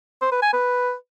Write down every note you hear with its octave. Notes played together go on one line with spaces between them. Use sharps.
C5
B4
G#5
B4